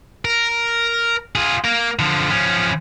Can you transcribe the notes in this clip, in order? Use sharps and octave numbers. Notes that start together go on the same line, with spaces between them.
A#4
F4 G#4
A#3 A#4
D3 F3
F3 C#4